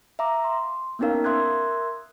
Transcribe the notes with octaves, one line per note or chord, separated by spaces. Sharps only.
E5 F5 A#5 D6
C6
A#3 B3 C#4 D#4 A#4 F5
A#4 E5 C6 D#6 F#6 G#6